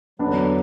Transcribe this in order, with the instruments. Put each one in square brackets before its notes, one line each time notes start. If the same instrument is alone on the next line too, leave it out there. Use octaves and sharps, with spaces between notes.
[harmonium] E2 D3 F#3 [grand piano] B3 D4